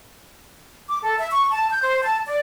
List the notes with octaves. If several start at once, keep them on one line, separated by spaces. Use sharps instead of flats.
D6
A4
E5
C#6
A5
G6
C5
A5
D5